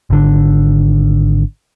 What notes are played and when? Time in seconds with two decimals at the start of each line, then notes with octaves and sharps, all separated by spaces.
0.10 G#1 D3